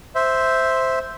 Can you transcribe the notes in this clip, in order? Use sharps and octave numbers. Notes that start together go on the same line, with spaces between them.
C5 E5